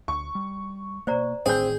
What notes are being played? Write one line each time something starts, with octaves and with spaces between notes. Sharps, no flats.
D2 C#6
G3
B2 A#3 C5 D5 A#5
A1 A2 D#3 C4 G#4 G6